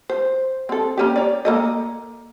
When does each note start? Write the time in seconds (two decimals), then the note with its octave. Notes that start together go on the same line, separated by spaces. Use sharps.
0.10 C5
0.69 C4 A4
0.98 A#3 C#4 G4
1.16 C#5 D5
1.45 A#3 A4 D#5